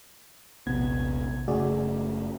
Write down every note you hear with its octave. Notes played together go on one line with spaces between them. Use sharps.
D#1 A#1 C3 B3 G#6
F#1 C#3 A3 F#4 G#4 D5